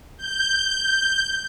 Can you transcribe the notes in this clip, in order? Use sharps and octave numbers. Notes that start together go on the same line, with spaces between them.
G6